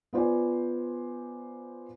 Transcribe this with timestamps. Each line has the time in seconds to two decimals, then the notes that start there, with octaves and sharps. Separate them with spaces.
0.13 B3 F4 C5 D5 G#5